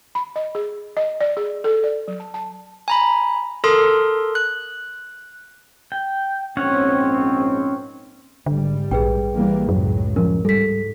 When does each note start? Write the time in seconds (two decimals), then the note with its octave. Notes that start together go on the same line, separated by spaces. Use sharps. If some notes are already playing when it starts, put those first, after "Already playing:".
0.15 B5
0.36 D#5
0.55 G#4
0.97 D#5
1.21 D5
1.37 G#4
1.64 A4
1.84 D5
2.08 F#3
2.20 A5
2.34 A5
2.88 G#5 A#5 B5
3.64 A4 A#4 C6 D#6
4.35 F#6
5.92 G5
6.57 A#1 G#2 C4 C#4 C#5 F#5
8.46 G#1 D3 G3
8.91 A#1 G#4 B4 G5
9.35 E3 G3 A#3
9.69 C#2 F#2 A2 F#3
10.16 F3 C#4 A#4
10.45 G#2 G3 A4 B6